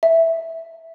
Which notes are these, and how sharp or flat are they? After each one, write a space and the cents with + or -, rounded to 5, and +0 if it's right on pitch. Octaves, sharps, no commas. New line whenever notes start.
E5 +0